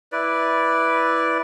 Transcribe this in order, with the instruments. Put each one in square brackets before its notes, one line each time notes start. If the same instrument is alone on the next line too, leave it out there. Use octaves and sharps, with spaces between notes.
[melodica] E4 B4 D5